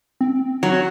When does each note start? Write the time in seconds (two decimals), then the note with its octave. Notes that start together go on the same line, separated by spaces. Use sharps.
0.21 C4
0.63 F#3